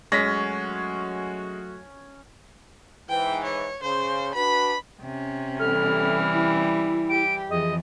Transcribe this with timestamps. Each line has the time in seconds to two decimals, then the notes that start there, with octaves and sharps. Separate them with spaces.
0.12 F#3 G#3 A3 C#4 F#4 A#6 B6
3.09 G#2 E3 G5
3.44 C#5
3.83 C#3 C5
4.35 D4 F#4 B4 B5
5.02 C3 C#4
5.59 E3 G3 A4 F6
6.33 E4
7.10 G4 D7
7.50 F2 E3 G#4 D#5